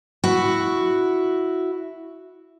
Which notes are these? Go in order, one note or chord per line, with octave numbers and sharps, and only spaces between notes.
E4 F#4